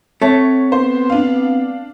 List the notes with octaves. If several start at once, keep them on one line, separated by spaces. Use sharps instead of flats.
A3 C4 C#5
B3 C5
D4 F5